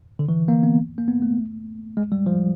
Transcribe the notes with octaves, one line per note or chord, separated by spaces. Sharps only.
D3
E3
A#3
B3
A#3
B3
A3
G#3
G3
F3